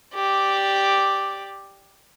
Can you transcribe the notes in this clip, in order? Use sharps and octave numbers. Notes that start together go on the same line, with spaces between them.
G4 D5